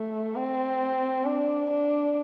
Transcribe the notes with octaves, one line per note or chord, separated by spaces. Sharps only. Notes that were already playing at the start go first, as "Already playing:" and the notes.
Already playing: A3
C4
D4
D4